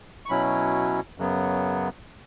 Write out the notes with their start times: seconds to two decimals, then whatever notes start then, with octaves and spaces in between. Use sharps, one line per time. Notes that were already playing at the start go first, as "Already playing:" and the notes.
0.26 C#6
0.29 B2 F#3 C#4 E4 B5
1.18 F#2 C#3 F#3 B3